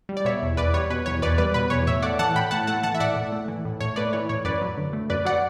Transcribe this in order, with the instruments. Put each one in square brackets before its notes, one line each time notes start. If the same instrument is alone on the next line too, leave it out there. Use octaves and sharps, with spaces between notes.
[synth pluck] G3
D5
B2 C#5 E5
E2
E2 B4 D5
G3 C#5
B2 B4
E2 C#5
E2 B4 D5
G3 B4 D5
B2 B4
E2 C#5
A2 C#5 E5
A3 D5 F#5
E3 F#5 A5
A2 G5 B5
A2 F#5 A5
A3 F#5 A5
E3 F#5 A5
E5
A2 D5 F#5
A2
A3
E3
A2
A2 C#5
A3 B4 D5
E3 C#5
A2 C#5
F#2 B4 D5
F#3
D3
A3
F#2 B4 D5
F#3 D5 F#5